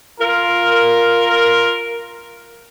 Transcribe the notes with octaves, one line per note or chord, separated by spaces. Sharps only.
F4 A#4